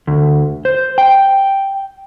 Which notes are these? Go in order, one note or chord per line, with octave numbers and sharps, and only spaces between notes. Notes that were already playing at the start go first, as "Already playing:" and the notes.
D2
C5
G5